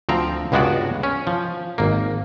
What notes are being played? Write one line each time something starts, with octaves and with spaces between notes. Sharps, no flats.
D2 F3 C4 A#5
C#2 G2 G#3 B3 F#4 D5
C#4
F3
G#1 A#3